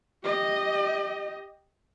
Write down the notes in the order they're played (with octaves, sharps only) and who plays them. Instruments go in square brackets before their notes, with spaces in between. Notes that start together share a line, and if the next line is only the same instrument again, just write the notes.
[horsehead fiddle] G4 D#5